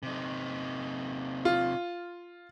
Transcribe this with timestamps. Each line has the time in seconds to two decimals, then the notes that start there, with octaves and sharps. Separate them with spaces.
0.03 C3 D#4
1.45 F4